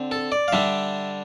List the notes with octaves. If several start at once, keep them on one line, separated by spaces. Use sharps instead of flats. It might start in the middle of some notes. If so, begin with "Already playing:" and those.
Already playing: D3 C4
A4
D5
F5
D3 G3 D4 E5